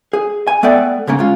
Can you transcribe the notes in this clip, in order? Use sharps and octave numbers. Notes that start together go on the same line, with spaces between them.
G#4
G#5
A3 B3 A4 D5 G5
C#2 G#2 C#3 A#3
G#3 C#4 F4